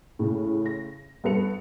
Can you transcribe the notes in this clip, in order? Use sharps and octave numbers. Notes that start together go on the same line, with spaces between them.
A2 C#3
A#6
G2 B3 A4 B4 C#7 F7